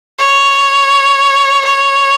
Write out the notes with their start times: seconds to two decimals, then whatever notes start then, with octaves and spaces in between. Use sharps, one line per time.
0.19 C#5
1.65 C#5